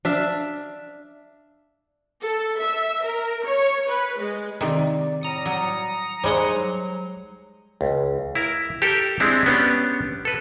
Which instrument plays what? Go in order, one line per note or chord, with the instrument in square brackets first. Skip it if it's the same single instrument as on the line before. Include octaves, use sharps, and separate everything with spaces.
[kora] D4 E5 F5
[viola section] A4
E5
A#4
C#5
B4
G#3
[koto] C3 D#3 [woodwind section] D5
[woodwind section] A2 G3 D5 [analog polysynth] A#5 D#6 C#7
[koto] F#3
[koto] G3 G#3 F#5 [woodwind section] D#4 [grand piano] C5
[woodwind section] F#3
[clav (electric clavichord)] C#2
E4 A#4
G4 A4 A#4
G#3 C4 D4 E4
B3 C#4 D4 G4
A4 B4